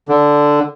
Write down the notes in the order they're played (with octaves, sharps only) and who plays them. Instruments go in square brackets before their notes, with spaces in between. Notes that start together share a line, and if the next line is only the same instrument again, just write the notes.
[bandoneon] D3